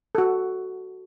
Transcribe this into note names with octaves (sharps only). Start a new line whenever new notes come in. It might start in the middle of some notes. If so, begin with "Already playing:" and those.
F#4 A4